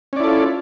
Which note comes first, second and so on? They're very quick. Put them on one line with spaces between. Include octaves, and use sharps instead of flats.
C#4 D5 E4 A4 F4